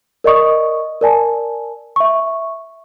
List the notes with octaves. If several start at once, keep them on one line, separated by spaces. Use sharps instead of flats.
A#4 D5 D#5 C#6 D#6
A#4 D5 G#5 A5
E5 C#6